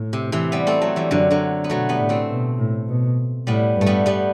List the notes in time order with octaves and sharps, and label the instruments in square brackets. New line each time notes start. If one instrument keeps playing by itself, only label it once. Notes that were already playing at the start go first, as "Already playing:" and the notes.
Already playing: [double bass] A2
[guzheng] C3
C3 E3
G3 B3
A3 C4
F#3 A3
E3 G3
[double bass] F#2 [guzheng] D3 F#3
[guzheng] D3 F#3
B3
[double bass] B2 [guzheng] F#3 A3
[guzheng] G3 B3
[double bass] A2
[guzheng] A3 C4
[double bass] B2
A2
B2
[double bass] A2 [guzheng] G3 B3
[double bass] G2
[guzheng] A3
G3 B3
G3 B3